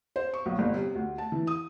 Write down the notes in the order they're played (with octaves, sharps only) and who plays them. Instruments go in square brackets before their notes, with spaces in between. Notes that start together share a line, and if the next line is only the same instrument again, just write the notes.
[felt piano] C5
C#6
B1
G1
C3
D2
A5
E3
D#6